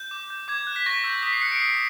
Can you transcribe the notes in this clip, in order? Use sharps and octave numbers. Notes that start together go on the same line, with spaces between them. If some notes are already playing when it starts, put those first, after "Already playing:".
Already playing: G6
D6
G6
D6 G#6
F#6
B6
C#6 A#6
E6 G6
D#6 B6
C7
F#6 C#7
D7
D#6 C7